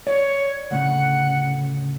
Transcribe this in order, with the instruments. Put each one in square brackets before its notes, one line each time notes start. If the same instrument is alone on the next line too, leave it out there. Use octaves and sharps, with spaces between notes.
[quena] C#5 [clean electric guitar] D5
[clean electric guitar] D2 A2 C#3 [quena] F#5